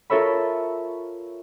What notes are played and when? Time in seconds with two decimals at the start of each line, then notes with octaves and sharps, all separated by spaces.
0.10 F4 A4 A#4 C#5 E5 B5